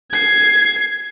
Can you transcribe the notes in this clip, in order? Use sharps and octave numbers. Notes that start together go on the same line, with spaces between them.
G#6 C7